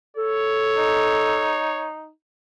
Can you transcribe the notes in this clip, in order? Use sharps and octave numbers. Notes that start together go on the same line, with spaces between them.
A4 C#5
D#4